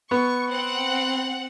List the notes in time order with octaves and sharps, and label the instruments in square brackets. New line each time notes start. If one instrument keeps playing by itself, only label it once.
[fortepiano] B3 [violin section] C#6
[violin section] C4 F#5